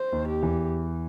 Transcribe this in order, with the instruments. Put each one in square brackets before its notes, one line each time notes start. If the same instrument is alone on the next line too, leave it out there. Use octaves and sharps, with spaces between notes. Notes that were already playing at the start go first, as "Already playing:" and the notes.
Already playing: [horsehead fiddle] C5
[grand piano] D#2 D#3
[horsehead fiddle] G4
[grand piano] E2 E3